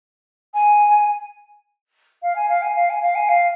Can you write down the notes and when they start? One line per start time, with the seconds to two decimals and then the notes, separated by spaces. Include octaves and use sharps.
0.54 G#5
2.22 F5
2.36 G#5
2.49 F5
2.62 G#5
2.76 F5
2.90 G#5
3.02 F5
3.15 G#5
3.29 F5